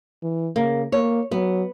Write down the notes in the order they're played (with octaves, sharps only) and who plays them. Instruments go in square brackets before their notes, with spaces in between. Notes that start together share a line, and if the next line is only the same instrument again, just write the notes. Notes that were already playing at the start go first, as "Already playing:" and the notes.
[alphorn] E3
[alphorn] C#3 [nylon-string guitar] A#3
[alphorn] A#3 [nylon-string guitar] C#5
[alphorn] F#3 [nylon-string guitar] B3